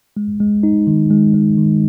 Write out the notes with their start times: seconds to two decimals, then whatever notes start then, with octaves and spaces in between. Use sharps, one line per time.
0.17 G#3
0.40 G#3
0.63 D#4
0.87 D#3
1.10 G#3
1.34 G#3
1.58 D#3